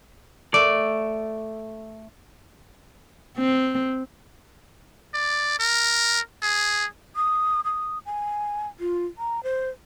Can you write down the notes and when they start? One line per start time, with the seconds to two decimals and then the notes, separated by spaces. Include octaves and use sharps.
0.54 A3 D5
3.38 C4
5.14 D5
5.59 A#4
6.42 G#4
7.16 D#6
7.65 D#6
8.06 G#5
8.80 F4
9.18 A#5
9.43 C5